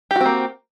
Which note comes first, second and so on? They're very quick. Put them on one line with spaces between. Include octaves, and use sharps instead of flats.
G4 F#4 C4 A#3